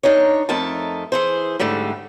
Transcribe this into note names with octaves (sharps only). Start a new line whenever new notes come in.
D4 D#4 A#4 C#5
F2 A3 D#4 A#4 A5
E3 G#4 C5
G#2 D3 G3 A3